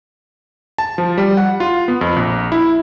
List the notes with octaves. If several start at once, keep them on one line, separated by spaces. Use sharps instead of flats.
A5
F3
G3
F#5
F4
B3
F2
A#1
E4